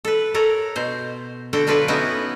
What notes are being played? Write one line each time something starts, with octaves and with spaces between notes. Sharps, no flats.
A4 B4
A4 A#4 C#5
B2 C5
D3 F#4 A4 G5
F#3 D4 F4 A4 B4 D5
B3 C#4 D#4 E4 F#4